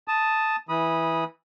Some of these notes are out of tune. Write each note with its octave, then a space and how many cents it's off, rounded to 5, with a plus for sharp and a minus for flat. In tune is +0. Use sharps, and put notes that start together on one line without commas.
A5 +0 D#6 +0
E3 -5 B5 -20 D#6 +0